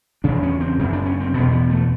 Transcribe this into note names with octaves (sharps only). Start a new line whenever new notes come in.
E2 C#3 D4
C#4
C4
F#2 C#3
D4
C#4
C4
E2 B2 B3
B3
A3